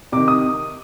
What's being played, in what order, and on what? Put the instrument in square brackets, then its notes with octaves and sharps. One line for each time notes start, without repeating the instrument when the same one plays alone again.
[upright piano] C3 D#3 D6
D#6